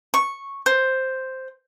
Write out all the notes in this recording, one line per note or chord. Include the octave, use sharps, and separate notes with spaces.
C#6
C5